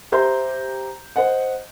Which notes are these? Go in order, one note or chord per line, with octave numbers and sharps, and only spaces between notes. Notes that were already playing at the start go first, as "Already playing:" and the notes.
G4 C5 E5 A#5 C6 G6
C5 D#5 F#5